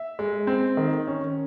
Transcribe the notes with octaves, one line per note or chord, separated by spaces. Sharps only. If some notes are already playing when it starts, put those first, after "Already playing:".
Already playing: E5
G#3
C4
D#3
C#4